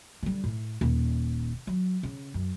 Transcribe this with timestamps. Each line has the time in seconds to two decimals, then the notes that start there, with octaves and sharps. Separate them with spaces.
0.23 D3 G3
0.44 A2
0.81 D#1
1.67 F#3
2.03 C#3
2.34 F#2